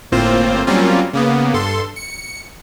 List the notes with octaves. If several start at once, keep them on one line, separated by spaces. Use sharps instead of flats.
G1 A2 A#3 C4 F4 C5
F#3 G3 A#3 C4 C#4 F4
C#3 A#3 B3
G2 A4 C6
C#7